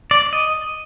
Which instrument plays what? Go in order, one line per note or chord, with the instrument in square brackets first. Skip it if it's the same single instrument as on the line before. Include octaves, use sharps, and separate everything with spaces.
[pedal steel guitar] D5
D#5